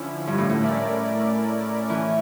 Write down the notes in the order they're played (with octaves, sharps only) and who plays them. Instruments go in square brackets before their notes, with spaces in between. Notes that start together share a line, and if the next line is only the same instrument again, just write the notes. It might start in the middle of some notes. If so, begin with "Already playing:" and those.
Already playing: [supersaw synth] D3 F3 C#4 E4
[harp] G2
A2
A2
[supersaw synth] A3 C#4 E4 A#4 D5
[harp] E3 [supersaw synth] A3 C#4